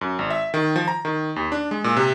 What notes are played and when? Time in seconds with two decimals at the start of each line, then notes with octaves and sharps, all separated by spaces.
0.01 F#2
0.19 G#1
0.30 E5
0.54 D#3
0.76 F3
0.88 A#5
1.05 D#3
1.36 D#2
1.52 D4
1.71 G#3
1.84 A#2
1.97 C3